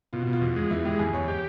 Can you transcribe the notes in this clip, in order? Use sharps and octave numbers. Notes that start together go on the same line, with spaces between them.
B2 F4
B2 F#4
F4
E2
G#3
F4
E2 E4
G#3 G4
E2 G#4
E2 C#5
G4 C#5